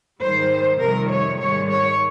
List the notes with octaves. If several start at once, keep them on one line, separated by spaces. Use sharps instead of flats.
G#2 D#3 G3 C5
F2 C3 D#3 G3 A#4
C#5
G#2 D#3 G3 C#5
C#5